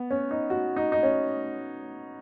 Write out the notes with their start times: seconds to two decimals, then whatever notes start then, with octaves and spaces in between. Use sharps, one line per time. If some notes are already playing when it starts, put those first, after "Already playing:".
Already playing: B3
0.11 C#4
0.31 D#4
0.50 F#4
0.76 D#4
0.92 D#4
1.03 C#4